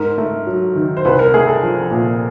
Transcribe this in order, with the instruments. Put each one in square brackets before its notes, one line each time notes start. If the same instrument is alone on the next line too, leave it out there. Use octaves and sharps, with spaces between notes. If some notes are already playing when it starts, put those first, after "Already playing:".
Already playing: [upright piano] G#2 A#4
A3
F#3
D#3
C5
C2 B4
A#4
A3 G#4
A4
F3
A#2